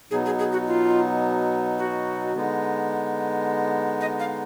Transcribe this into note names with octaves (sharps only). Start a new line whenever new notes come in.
B2 F#3 B3 D#4 G#4
G#4
G#4
F#4
F4
F#4
D3 G#3 B3 D#4
D#5
F5